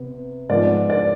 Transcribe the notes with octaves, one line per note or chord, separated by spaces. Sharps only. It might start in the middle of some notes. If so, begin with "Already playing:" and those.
Already playing: C3 B3
G#2 F3 B3 D5
D5